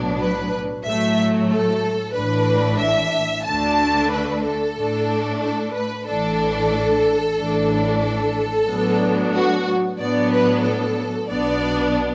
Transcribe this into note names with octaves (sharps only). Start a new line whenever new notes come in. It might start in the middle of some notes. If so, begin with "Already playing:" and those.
Already playing: B1 A2 F#3 B3 D4
B4
A2 F#3 A3 E5
A4
A1 A2 E3 D4 B4
E5
D2 D3 A3 D4 A5
B4
A4
A2 A3 D4
A4
B4
A1 A2 E3 D4 A4
A1 A2 E3 D4
A4
A2 F#3 B3 D4
F#4
A2 F#3 B3 D4 D5
B4
A4
B1 B2 B3 D4 D5